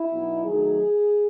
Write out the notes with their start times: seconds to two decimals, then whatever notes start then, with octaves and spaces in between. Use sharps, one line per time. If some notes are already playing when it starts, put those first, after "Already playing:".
Already playing: E4
0.10 B2 F#3 B3 D#4
0.44 D#3 F#3 A3 D#4 G#4